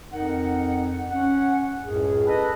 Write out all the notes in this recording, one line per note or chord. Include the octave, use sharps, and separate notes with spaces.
F2 D#4 A#4 F#5
C#4 F#5
C#2 F#2 A2 C#4 G#4
A4 B4 D#5